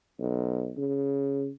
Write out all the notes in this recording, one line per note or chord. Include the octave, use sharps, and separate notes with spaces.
B1
C#3